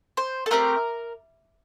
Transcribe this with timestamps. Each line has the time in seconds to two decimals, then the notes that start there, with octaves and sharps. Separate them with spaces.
0.17 C5
0.46 A4
0.51 A3 C4 G4 A#4